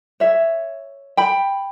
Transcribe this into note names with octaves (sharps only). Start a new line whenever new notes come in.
C#5 E5
G5 B5